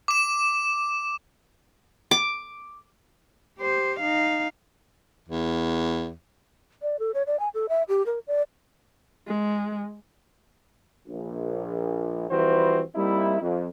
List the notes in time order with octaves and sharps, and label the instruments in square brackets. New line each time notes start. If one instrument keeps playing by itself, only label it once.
[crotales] D6 E7
[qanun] D6
[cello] G4 C5
D#4 F5
[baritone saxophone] E2
[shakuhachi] D5
A4
C#5
D5
G#5
A4
E5
G4
A#4
D5
[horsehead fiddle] G#3
[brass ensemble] A#1
E3 F3 G3 C4 F#4 C5
G3 A#3 C4 D#4 E4
F2